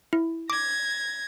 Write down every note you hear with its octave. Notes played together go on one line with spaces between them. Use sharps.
E4
D6 G#6 A#6